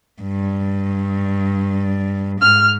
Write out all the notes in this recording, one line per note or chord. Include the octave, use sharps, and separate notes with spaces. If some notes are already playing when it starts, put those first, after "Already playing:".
G2
G#2 F6